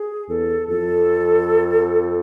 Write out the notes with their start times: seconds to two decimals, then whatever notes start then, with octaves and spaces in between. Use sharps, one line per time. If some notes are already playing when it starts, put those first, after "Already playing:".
Already playing: G#4
0.28 E2 A4
0.68 F2 A4